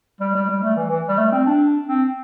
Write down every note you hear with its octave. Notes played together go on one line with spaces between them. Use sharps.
G3
G3
G3
A3
E3
E3
G3
A3
C4
D4
C4